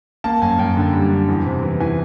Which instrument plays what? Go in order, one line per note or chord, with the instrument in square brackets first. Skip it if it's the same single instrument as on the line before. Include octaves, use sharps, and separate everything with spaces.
[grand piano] A#3 A5
F#2 G#5
F#2 G5
D3
G3
D3
E2
C3
E3
E3 G#5